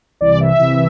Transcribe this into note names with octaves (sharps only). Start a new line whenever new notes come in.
C2 C3 E3 D5
E5
C2 C3 E3